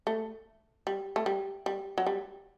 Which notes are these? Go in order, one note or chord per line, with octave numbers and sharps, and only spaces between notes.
A3
G3
A3
G3
G3
F#3
G3